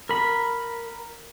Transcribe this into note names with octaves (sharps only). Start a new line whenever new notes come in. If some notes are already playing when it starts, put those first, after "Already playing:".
A#4 B5